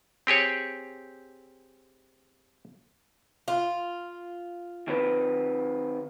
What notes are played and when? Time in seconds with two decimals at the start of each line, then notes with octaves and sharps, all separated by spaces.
0.27 C4 G4 G#4 C#5
3.48 F4
4.88 D#3 C4 B4